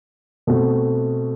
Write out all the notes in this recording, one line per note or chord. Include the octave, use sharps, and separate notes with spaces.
B2 A3 C4 F#4 A4